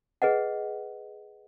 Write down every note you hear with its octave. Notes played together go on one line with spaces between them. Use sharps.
G#4 B4 D#5 F#5